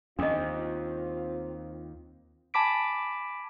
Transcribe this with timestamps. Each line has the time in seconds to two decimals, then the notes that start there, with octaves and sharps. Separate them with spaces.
0.19 D#2 C4 D4 F4 D#5
2.54 G#5 A5 B5 D6 B6 D7